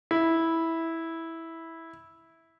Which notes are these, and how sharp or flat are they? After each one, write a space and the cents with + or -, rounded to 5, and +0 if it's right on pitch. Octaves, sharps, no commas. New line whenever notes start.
E4 -10